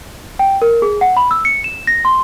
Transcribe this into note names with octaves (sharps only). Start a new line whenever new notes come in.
G5
A#4
G#4
F#5
B5
E6
C#7
E7
A#6
C6